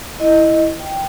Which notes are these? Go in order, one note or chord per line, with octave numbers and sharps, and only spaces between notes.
E4 D#5
G5